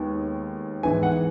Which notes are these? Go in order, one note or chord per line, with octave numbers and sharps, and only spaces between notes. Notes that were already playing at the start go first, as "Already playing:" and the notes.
Already playing: D#2 D#3 G#3 B3
G#2 E3 B3 G#5
F#5